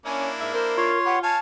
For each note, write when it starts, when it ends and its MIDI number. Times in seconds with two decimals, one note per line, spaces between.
0.06 0.91 58
0.06 0.29 61
0.06 0.91 62
0.06 0.91 64
0.40 0.53 44
0.40 0.53 70
0.40 0.53 76
0.54 0.99 70
0.54 0.73 72
0.78 1.35 65
0.78 1.19 73
0.78 1.19 84
1.05 1.17 67
1.05 1.17 71
1.05 1.20 78
1.23 1.38 73
1.23 1.38 77
1.23 1.38 80
1.23 1.39 81